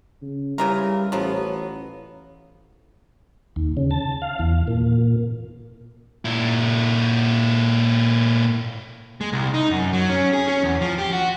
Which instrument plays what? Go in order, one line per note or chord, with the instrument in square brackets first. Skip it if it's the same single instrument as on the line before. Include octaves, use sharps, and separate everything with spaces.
[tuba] C#3
[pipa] C#3 E3 A#4 [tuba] G3
[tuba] A1 [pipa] F3 F#3 B3
[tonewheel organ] D#2
C#3
A5
F5
E2
A#2
[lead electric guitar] A#2 E4
G#3
C2
D#4
F#2
F#3
C#4
G#4
C#4
E2
F3
G4
F#4